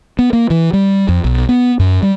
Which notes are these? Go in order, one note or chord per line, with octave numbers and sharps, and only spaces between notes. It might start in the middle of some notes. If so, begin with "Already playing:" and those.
B3
A#3
E3
G3
F2
B1
B3
F#2
G3